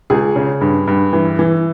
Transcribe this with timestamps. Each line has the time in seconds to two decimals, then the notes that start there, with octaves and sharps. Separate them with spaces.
0.10 C#2 G#4
0.36 C#3
0.61 G2
0.87 G2
1.13 E3
1.39 E3